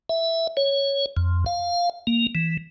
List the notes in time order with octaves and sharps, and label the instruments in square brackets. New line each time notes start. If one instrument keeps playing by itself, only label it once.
[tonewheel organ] E5
C#5
F2
F5
A#3
E3